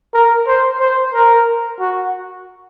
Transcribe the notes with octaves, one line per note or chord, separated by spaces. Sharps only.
A#4
C5
C5
A#4
F#4